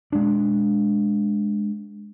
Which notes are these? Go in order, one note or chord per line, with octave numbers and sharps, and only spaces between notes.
G#3 D4